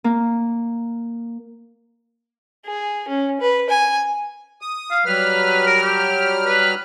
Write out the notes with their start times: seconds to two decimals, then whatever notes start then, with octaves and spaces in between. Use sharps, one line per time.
0.04 A#3
2.66 G#4
3.08 C#4
3.41 B4
3.70 G#5
4.61 D#6
4.91 F5
5.06 F#3 G3 B4 F6
5.66 A#4
5.83 G4
6.46 B4